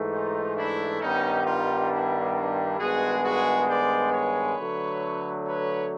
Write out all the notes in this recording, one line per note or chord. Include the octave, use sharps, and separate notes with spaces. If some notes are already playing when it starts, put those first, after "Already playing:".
Already playing: G#2 E3 A3
D#4 F4
D4 E4
G2 D#3 G3 B3 C#4 D#4
D#4 F4
D4 E4
D4 E4
G2 D#3 G#3 B3 F#4 G#4
F#4 G#4
C5 D5
B4 C#5
D3 F#3 A3
B4 C#5